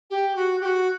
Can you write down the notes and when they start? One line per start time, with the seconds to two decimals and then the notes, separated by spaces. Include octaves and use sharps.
0.10 G4
0.35 F#4
0.60 G4
0.65 F#4